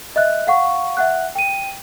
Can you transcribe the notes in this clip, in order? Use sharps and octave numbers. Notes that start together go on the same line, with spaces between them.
D#5 E5 F#6
F5 F#5 C#6
E5 F#5 F#6
G5 D#7